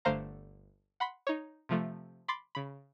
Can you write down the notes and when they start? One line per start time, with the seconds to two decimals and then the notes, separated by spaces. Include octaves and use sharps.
0.05 G1 D3 A3 C5 F5 A#5
1.00 F#5 B5 C6 B6
1.27 D#4 C#5
1.69 C3 F3 A3
2.28 B5 C6 D6 A6 C7
2.55 C#3 B5